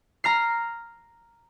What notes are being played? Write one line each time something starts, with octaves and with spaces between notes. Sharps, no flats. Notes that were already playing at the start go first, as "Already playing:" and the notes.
A#5 F6 C7